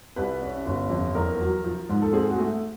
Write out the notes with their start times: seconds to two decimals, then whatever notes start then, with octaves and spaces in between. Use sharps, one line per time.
0.16 C2 B4
0.42 C#4
0.66 G1
0.90 F2
1.15 E2 A#4
1.40 F#3
1.64 F3
1.89 G#2
2.02 A4
2.13 C4 G#4
2.30 F#4
2.38 A3